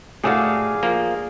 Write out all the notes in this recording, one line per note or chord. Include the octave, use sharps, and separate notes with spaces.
A2 A3 F#4 G#4 D5 F5
F3 A#3